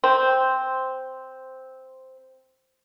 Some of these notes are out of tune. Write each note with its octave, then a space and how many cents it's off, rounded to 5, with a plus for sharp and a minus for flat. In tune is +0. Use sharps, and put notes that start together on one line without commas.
C4 +0 C5 -5